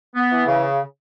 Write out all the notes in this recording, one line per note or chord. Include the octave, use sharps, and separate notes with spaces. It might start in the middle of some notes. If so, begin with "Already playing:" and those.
B3
E3
C#3